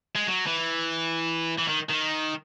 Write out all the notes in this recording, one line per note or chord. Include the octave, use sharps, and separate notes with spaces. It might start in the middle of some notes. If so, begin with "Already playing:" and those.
G#3
F#3
E3
E3
D#3
D#3